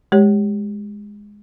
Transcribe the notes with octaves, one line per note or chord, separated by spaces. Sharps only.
G#3 G4 C#5